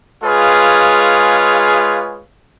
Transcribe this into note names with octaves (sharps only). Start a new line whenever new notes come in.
G#3 F4 G#4 B4 C#5 F5